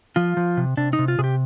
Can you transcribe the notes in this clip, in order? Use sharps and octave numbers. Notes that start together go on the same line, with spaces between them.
F3 F4
F3
C3
C3 D4
D#4
C3
F4
C3 G#4
G4